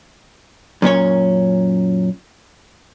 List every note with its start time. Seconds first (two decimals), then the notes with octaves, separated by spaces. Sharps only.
0.82 F#2 A#2 C#4 C#5